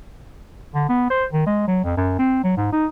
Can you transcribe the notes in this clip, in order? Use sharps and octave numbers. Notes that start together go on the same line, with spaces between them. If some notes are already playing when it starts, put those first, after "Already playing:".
D3
B3
C5
D#3
G#3
F#3
F2
F#2
C4
F#3
G#2
D#4